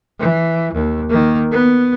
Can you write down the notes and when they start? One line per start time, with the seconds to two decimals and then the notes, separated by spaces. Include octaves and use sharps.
0.19 E3
0.73 D#2
1.09 D#3 A#3
1.51 B3